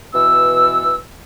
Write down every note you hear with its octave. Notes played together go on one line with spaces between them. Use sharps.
B2 E3 E6